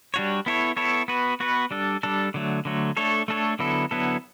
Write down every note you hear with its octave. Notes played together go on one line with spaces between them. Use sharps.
G3 D4 F#4 C#5
B3 E4 A4 C#5
B3 E4 A4 C#5
B3 F#4 B4
B3 F#4 B4
G3 D4 A4
G3 D4 A4
D3 F#3 A3
D3 F#3 A3
A3 D4 A4 C#5
A3 D4 A4 C#5
D3 F#3 B3 E4 A4
D3 F#3 B3 E4 A4